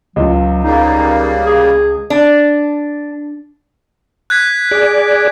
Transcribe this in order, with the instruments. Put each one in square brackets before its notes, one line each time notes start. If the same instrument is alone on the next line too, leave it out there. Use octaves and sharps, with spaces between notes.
[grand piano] C#2 F4 [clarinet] F#3
[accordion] C#3 G3 A#3 [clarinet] D#4
[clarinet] G#4
[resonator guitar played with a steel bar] D4
[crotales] F#6 G#6 B6
[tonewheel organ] G#4 D5